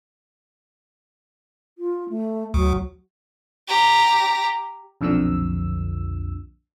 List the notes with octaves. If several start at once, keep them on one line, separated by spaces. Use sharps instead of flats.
F4
A3
D2 F#3
G4 A#5
B1 F2 A#2 D3 F3 E6